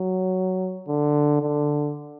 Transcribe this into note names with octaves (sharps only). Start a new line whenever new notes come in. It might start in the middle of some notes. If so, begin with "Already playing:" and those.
Already playing: F#3
D3
D3